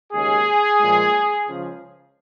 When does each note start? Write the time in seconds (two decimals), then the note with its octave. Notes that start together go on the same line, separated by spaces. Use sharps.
0.13 D#2 C#3 G#3 C#4 G#4
0.79 A#2 F3 G#3
1.46 C#2 C#3 F3